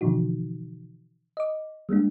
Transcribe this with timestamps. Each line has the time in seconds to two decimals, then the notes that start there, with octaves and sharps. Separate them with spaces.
0.01 B2 D3 E3 F3 D#4 F#4
1.37 D#5 D6
1.89 G3 G#3 A#3 D4